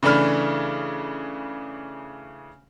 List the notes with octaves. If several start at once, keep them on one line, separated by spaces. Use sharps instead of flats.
C#3 E3 A3 D4 B5 F6